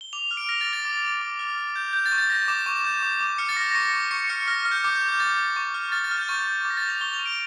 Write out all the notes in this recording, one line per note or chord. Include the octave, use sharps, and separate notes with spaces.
G7
D6 F7
F6
D7
F6 A#6
A6
D6
A6
D6
D6
D6
F6
D6
G6
G6
A6
C#6
A6
G6 A#6
D6 E7
C#6 E7
G6
D6
D6
F6 C#7
A6
D6 A#6
A#6
C#6 C#7
C#6
C#6 C#7
F6 C#7
F6 A#6
F6
G6
D6
G6
D6
G6
D6 A6
D6
C#6
F6
F6 A6
A6
F6
G6
C#6 A6
G6
D6
A#6
A6
G6
F7
C#6 G7
F7
C#6
D7